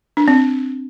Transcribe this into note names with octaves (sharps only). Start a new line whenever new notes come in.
D4
C4